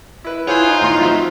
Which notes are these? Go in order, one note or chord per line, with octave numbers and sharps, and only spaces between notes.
E4 B4
E4 F4 G#4 C5 C#5 F#5 G#5
D#4
A2 E3 B3 D#5 C6
F3 F#3 C4 E5